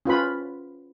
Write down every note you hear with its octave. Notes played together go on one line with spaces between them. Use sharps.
C#4 F4 B4 B5